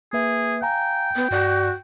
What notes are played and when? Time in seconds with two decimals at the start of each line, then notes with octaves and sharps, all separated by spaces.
0.13 A#3 G#4 B4 E5
0.62 F5 G5 G#5 A#5
1.16 B3
1.31 G2 F#4 D5